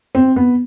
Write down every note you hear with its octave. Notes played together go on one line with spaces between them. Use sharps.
C4
B3